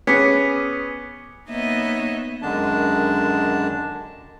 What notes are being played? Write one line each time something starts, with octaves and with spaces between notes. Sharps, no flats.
B3 C#4 G#4 D6 B6 C#7
A#3 B3 D#4 C#5 D#5 E5
F#2 D3 D#3 G#3 D4 A5